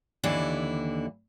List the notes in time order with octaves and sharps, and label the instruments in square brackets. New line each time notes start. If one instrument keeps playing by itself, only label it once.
[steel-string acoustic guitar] D#2 D3 E3 E4